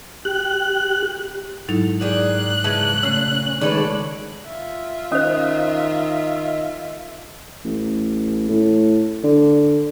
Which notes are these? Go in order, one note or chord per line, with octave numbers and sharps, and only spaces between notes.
G4 F#6
G#2 F#3 D#4 E4 A4
D#3 G#4 D5 F#6
C#3 E3 D#4 A5 G#6
A#2 C#3 A3 C#4
D#3 G#3 D4 A4 B4 C#5
F4 E5
D#3 C#4 C5 D#5
A1
A2
D3